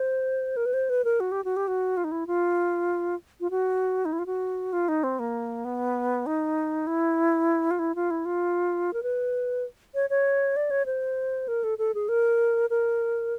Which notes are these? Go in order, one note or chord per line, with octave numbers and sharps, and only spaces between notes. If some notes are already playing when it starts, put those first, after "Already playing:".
Already playing: C5
A#4
B4
C5
B4
A#4
F#4
G4
F#4
G4
F#4
F4
D#4
E4
F4
F4
F#4
D#4
E4
F4
F#4
F4
D#4
C4
A#3
B3
D#4
E4
F4
E4
F4
E4
F4
A#4
B4
C#5
C#5
D5
C#5
C5
A#4
A4
A4
G#4
A#4
A#4